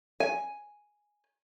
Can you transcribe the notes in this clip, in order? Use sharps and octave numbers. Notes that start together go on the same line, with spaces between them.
G#5